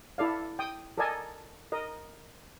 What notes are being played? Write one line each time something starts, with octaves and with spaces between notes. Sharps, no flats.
E4 A4 D5 F5
G5 D#6
A4 A#4 D5 D#5 G#5 A5
A#4 D#5